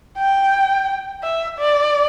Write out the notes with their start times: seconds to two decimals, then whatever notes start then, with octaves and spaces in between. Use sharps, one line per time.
0.18 G5
1.23 E5
1.59 D5